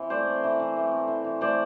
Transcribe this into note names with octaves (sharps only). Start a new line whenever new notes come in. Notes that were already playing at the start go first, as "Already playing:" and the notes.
Already playing: E3 C4
A3 C5 D5
C4
E3
E3
A3
C4
E3
E3
A3 C5 D5